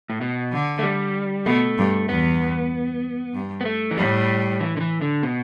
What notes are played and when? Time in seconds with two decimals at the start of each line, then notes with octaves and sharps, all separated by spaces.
0.10 A2
0.21 B2
0.52 D3
0.79 A3
0.83 G3
1.46 B2 A3
1.78 G2
2.09 E2 B3
3.34 G2
3.61 B3
3.65 A3
3.91 E3
3.97 A2 G3
4.60 E3
4.77 D3
4.81 E3
5.01 D3
5.23 B2